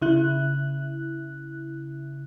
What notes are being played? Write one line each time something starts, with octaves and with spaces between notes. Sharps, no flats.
C#3 E4 F#6